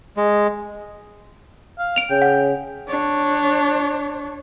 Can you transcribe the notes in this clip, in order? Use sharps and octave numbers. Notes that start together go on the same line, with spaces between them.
G#3
F5
D7 F7
C#3 G5
F#5
D4 C#5